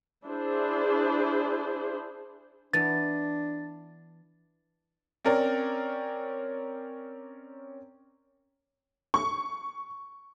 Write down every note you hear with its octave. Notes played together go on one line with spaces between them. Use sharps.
D4 E4 G#4 C5
E3 B3 D4 A6
C4 C#4 A#4 D5
C#6